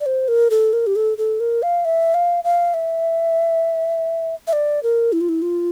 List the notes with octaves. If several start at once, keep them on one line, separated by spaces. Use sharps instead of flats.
D5
C5
A#4
A4
A#4
G4
A4
A4
A#4
F5
E5
F5
F5
E5
E5
D5
A#4
E4
F4
E4
F4